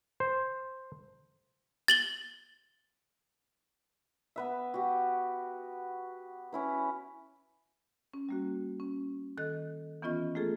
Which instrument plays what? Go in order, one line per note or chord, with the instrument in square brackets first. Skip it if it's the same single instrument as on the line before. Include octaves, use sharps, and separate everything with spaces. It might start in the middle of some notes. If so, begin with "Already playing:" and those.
[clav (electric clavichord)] C5
[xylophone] A6 F#7 G7
[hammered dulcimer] B3 B4 E5
F#4 G4
C#4 E4 B4
[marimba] C#4
G3 A#3 F#4
C#4
D#3 A4 D#5 F#6
E3 B3 C#4 F4 D#5 C#6
A3 A#3 F4 G#4 A4